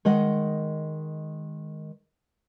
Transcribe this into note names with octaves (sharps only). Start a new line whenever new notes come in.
D#3 G#3 D#5 F#5